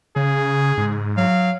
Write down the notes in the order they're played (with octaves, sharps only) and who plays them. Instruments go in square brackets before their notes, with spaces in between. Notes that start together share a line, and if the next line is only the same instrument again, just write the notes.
[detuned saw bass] C#3 [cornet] G#4
[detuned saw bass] G#2
[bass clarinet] F#3 [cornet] F5